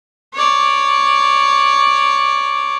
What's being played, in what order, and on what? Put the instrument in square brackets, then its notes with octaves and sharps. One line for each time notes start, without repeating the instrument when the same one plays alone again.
[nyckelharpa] C#5 D5